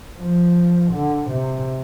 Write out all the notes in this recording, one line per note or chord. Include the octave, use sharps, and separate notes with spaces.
F3
D3
C3